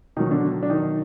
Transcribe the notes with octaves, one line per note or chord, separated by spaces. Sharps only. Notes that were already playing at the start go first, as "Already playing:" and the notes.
B2 D#3 F#3 D#4
D3 D4
D4
D#3 D#4